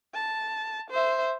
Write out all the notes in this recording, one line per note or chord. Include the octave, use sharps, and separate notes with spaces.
A5
C5 E5